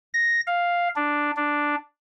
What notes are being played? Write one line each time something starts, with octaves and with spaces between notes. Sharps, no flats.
A#6
F5
D4
D4